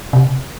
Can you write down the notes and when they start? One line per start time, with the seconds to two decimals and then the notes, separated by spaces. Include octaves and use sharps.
0.13 C3